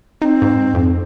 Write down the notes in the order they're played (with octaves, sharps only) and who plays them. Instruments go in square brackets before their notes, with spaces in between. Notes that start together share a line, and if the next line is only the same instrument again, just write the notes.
[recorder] C4 [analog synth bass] D#4
[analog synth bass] G#2
F2